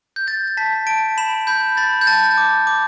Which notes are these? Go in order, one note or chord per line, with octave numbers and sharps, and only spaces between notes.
G6
G6 A6
A6
A5 B6
A5 D7
B5 E7
B5 G6
B5 A6
G6
A5 A6
D6
D6